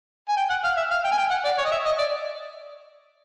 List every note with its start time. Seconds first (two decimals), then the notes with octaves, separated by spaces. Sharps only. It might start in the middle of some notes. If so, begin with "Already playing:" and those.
0.29 G#5
0.37 G5
0.50 F#5
0.64 F5
0.77 E5
0.91 F5
1.05 G5
1.11 G#5
1.18 G5
1.31 F#5
1.45 D5
1.58 C#5
1.65 D#5
1.72 E5
1.85 D#5
1.98 D5